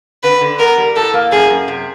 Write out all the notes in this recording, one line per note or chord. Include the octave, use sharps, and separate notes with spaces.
D3 B4
D3
B3 A#4
G3
A2 A4
A#3
F#2 G#4
F#2
C3